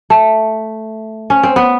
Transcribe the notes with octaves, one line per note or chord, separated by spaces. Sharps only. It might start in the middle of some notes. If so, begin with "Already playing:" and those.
A3
C#4
C4
B3